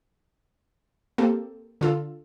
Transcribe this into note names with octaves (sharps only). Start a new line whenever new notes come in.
A#3 C4 G4 A4
D3 F4 A4